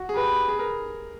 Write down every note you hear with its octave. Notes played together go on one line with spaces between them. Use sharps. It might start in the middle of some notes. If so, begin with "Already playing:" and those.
Already playing: F#4
G#4
G4 B4
G#4
A#4